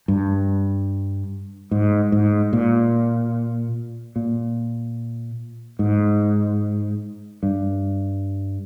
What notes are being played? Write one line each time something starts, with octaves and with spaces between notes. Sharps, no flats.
G2
G#2
G#2
A#2
A#2
G#2
G2